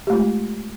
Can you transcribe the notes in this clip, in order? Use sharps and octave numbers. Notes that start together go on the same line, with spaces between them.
G#3 A3 F4 G4